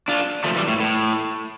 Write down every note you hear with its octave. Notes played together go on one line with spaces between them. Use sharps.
D4 F4
F3 A3
E3 G3
A2
A2